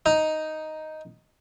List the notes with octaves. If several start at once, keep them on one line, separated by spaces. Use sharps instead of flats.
D#4